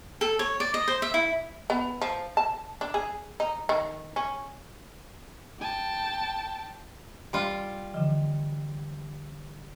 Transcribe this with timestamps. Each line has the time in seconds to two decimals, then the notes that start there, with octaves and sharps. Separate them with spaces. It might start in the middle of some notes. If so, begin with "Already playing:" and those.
0.21 A4
0.39 C#5
0.60 D5
0.74 D#5
0.88 C5
1.02 E5
1.14 E4
1.70 B3
2.02 F3
2.37 A5
2.81 D4
2.94 G#4
3.40 D#4
3.69 D#3
4.16 C#4
5.60 G5 A5
7.33 G3 F4
7.94 D3 E3 F3